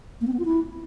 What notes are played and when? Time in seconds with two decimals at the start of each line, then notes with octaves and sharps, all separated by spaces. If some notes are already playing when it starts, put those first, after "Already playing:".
0.21 A#3
0.27 C4
0.33 B3
0.39 F4
0.45 E4